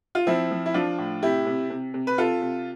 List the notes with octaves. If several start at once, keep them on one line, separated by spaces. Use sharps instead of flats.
F4
F3 C4 E4
F3
E4
F3 D4 F4
A2
C3 E4 G4
C3
C3
C3
B4
C3 F4 A4
C3